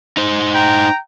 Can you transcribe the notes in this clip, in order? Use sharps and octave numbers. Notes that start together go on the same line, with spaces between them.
D#4 C5
G5 A#5